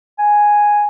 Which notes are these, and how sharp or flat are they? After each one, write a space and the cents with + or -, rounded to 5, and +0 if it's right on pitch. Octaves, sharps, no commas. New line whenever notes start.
G#5 +0